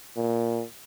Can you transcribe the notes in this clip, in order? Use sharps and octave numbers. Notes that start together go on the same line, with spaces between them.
A#2